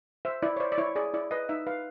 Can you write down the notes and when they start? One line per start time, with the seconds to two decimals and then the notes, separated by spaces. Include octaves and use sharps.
0.25 C5 E5
0.42 E4 D5
0.57 C#5
0.60 C5 D5
0.72 D5
0.78 E4 C#5
0.96 G#4 D5
1.14 E4 D5
1.31 B4 D#5
1.49 D#4 E5
1.67 B4 F5